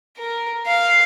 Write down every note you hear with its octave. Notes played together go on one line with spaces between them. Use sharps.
A#4
F5